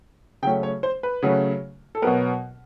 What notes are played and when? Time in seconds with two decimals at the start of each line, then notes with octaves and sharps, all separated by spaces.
0.42 C#3 F#3 A3 C#4 G5
0.63 C#5
0.83 C5
1.03 B4
1.22 C#3 F#3 A3 C#4
1.95 A4
2.02 B2 F#3 B3 A#4